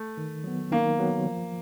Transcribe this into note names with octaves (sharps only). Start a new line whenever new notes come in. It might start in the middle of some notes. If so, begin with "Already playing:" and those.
Already playing: A3
D#3
F#3 B3
D#3 A#3
F#3 B3
F3